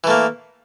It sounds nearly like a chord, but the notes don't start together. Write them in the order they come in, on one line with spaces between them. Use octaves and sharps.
E3 A3 A#3